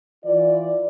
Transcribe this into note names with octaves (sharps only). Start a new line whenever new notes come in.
E3 F4 D5